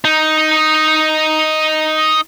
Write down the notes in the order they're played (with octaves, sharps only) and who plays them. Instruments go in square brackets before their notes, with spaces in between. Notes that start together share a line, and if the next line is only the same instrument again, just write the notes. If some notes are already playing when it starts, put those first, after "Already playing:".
[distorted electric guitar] D#4